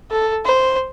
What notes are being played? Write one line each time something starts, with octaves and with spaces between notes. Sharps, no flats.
A4
C5